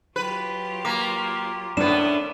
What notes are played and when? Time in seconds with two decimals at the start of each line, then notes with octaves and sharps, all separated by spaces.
0.16 F#3 F4 G4 B4
0.85 A#3 D6
1.77 A2 D#3 B3 C#4 D4 E7